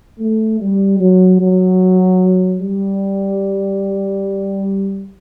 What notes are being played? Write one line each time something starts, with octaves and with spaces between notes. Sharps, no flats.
A3
G3
F#3
F#3
G3